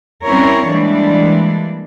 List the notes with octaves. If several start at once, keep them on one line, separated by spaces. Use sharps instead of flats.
G3 C4 C#4 E4 A#4 C#5
E3 G3 G#3 A#3 D4